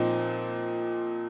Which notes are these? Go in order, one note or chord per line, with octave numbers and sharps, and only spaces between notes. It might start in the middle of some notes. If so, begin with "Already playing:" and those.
Already playing: A#2 F3 C4 D#4